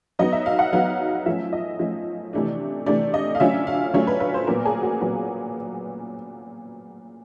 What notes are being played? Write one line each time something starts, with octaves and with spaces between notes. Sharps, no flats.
F#3 B3 D#4 D#5
E5
F5
F#5
F#3 B3 D#4 F5
F3 A3 C#4 E5
D#5
F3 A3 C#4
C3 E3 A3 D4
C3 E3 A3 D4 D5
D#5
F5
D3 F#3 A3 C#4 F4 E5
F5
D3 F#3 A3 C#4 F4 C#5
B4
B4
C5
A#2 F#3 B3 A#4
G#4
F#4
A#2 F#3 B3